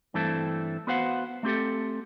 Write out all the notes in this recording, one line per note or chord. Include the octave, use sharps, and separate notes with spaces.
G2 E3 A3 C4 A4
B3 F#4 B4 C5 F5 F#5
A3 C4 G4 A4